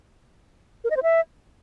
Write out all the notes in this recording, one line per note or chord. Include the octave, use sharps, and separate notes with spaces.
A#4
D#5
C5
E5